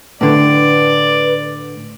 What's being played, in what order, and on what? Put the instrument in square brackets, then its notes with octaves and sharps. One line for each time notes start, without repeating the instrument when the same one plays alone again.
[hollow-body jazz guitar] A2 D3 [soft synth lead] B4 [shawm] D5